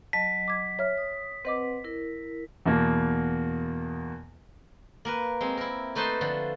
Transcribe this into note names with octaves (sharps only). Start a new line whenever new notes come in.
F#3 D#5 A5 B6
D6 G#6
C#5 E5 F6
D#6
C4 B4 C5 D#5 F#5 D6
E4 A#4
E2 B2 A#3
A#3 A#4 B4
G#3 C4
E4 A#4
A3 D#4 B4 C5 A5 C6
D3 F3